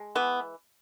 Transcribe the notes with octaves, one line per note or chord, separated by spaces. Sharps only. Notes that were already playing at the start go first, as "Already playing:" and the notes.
Already playing: G#3
E3 B3